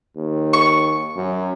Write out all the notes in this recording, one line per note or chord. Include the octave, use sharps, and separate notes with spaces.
D#2
C#6
F#2